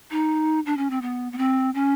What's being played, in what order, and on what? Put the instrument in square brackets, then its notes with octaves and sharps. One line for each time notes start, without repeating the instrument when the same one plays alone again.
[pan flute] D#4
D4
C#4
C4
B3
B3
C4
C#4